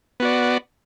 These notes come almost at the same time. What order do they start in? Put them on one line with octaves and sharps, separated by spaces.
B3 F#4 D5